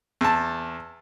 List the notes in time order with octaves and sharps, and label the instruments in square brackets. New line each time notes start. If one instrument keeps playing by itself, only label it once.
[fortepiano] E2 A5